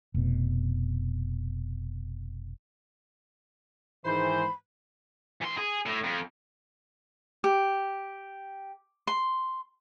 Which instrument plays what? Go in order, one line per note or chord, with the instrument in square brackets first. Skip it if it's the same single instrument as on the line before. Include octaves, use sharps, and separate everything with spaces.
[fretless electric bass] F1 B2
[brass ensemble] G#2 D#3 E3 [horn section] C5 [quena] B5
[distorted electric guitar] E3 C6
G#4
A2
F2
[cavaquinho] G4
C6